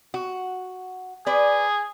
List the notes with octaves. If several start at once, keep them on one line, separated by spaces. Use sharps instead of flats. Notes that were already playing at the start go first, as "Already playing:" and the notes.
F#4
G#4 B4 D5